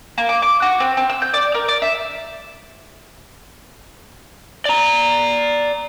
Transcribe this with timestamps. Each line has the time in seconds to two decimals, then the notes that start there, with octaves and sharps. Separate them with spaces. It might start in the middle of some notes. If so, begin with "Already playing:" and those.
0.18 A#3
0.29 D6
0.42 D6
0.62 F#4
0.80 C4
0.97 C4
1.10 E6
1.22 G6
1.34 D5
1.54 A#4
1.68 D5
1.82 E5
4.65 D5 A#5